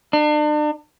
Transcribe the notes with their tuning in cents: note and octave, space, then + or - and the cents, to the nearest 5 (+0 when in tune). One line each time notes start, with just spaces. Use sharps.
D4 +40